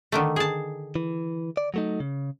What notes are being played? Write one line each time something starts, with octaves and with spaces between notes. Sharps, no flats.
D3 D#3 A3
G#4 A5
E3
D5
F#3 A3 D#4
C#3